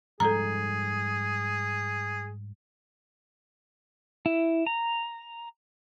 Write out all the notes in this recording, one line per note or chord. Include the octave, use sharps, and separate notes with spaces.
G#2 F3 G3 G#4 A4 A#5
E4
A#5